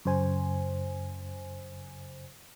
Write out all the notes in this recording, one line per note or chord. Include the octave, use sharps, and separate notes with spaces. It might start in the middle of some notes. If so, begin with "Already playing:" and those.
F#2 C#3 C5 G#5